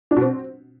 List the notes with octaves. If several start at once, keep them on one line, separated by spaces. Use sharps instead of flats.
D4
B2
C4